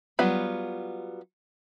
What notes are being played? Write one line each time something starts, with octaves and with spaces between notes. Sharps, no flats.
F#3 G3 B3 F4 B5